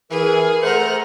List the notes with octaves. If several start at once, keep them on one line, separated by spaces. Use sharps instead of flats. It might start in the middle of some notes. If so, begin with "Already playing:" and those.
E3 G#4 A#4
A3 C5 F#5 A#5